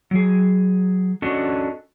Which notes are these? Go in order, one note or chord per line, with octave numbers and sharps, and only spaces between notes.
F#3 G#4
C#4 D4 F#4 A4 D#5